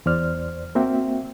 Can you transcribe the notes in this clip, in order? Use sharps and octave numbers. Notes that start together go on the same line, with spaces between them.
E2 C5 D5 F6
A#3 C4 F#4 E5 G5